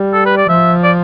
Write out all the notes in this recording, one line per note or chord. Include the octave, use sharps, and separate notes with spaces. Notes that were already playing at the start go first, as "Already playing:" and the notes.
Already playing: G3
A4
B4
D5
F3 E5
D5